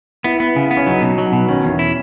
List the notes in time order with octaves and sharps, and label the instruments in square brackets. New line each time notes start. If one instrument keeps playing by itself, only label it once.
[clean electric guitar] B3 [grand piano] E4
[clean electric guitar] B3
C#3
B3
[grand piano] C#4
[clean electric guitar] F#3 [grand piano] D#4
[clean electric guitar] B2
F#3
B2
[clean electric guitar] D#3 [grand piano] C#4
[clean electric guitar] E2
E4